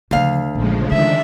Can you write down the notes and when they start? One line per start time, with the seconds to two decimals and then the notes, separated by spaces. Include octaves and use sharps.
0.11 D2 C#3 F3 F5
0.55 A#1 C#3 F3 G#3
0.92 D3 D#3 G#3 D4 E5